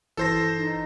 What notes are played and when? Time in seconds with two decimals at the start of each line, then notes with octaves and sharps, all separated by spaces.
0.17 G1 E3 A4 C5 A#6
0.56 D#4